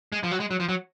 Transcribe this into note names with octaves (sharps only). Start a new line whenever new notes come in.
G#3
F3
F#3
G#3
F#3
F3
F#3